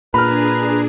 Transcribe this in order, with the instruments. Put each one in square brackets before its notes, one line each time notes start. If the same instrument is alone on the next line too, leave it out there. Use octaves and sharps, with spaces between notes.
[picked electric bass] A#2 [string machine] D4 G#4 [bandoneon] B4 A#5 [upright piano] B5 F6